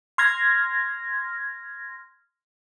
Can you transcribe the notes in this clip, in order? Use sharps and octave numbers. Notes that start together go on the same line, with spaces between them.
C6 F6 G#6 A#6